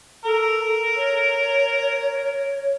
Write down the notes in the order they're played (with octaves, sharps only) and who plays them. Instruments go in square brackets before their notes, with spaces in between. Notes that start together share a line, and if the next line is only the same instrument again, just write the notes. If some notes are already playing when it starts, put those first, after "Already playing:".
[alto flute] A4 [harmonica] A#4
[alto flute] C#5